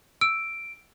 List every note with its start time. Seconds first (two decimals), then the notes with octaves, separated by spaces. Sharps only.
0.21 E6 D7